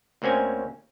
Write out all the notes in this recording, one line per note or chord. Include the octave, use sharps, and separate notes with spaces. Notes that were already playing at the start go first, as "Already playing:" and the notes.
D2 A#3 C4 C#4 G#5